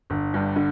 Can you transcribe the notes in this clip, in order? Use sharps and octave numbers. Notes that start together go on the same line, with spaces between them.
G1
G2
D3